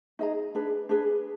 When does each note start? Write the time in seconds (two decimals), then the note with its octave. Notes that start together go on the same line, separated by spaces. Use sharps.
0.19 D#4 G#4 D#5 A#5
0.55 D4 G#4 B4
0.89 D4 G#4 B4